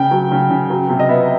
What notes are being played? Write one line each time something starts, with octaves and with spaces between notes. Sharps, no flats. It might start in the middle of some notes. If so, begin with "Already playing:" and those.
Already playing: C#3 G5
F#3
C#3
C#3
F#3
C3
D#5
B3 E5